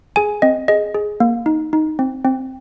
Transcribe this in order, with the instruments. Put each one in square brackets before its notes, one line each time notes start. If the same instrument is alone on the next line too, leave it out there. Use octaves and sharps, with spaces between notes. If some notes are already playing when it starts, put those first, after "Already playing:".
[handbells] G#4 G#5
C4 D#5
G#4 D#5
G#4
A#3
D#4
D#4
C4
C4